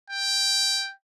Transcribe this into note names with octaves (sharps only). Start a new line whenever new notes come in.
G5